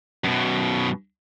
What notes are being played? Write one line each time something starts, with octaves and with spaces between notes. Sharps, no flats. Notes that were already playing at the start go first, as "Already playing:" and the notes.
F#2 B2